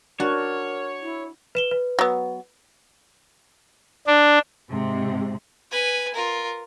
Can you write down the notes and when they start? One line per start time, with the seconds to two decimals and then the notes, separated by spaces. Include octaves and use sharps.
0.20 D4 F#4 A#4 C#5
1.02 E4
1.55 B4 E7 G7
1.71 B4
1.99 F#3 B3
4.07 D4
4.69 G#2 C3
5.72 B4 G#5
6.14 F4 A#4